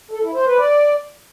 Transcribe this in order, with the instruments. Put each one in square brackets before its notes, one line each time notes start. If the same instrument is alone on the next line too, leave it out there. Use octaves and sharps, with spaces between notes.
[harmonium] A4
E4
C5
B4
D5